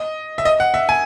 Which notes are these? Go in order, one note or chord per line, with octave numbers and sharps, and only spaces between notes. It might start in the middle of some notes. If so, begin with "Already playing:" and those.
Already playing: D#5
E5
D#5
F#5
E5
G#5